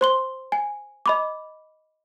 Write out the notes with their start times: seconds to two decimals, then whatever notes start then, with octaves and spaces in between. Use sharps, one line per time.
0.01 C5 C6 G7
0.52 G#5
1.06 D#5 B5 D6